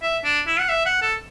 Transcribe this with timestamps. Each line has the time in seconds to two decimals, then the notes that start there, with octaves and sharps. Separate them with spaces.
0.02 E5
0.24 D4
0.47 E4
0.59 F#5
0.69 E5
0.86 F#5
1.02 A4